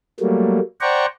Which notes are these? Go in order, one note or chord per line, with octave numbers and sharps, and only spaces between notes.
F#3 G3 A3 A#3
C5 D5 F#5 G5 A#5 C#6